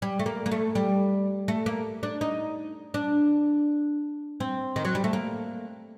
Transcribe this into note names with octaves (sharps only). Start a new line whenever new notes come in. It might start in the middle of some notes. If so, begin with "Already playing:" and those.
G3
A3
A#3
A#3
A3
G3
A3
A#3
D4
D#4
D4
C4
D#3
F#3
G3
A3
A#3